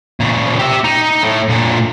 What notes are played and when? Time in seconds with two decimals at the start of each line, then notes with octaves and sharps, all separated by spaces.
0.20 A#2 C#3
0.59 G4 E5
0.84 D#4
1.24 A2
1.49 A#2 D3